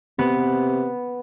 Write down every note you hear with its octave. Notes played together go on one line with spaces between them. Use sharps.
C3 B3